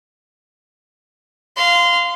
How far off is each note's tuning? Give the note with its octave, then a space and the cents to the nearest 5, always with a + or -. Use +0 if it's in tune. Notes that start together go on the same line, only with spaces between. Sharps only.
F5 +0 C6 -20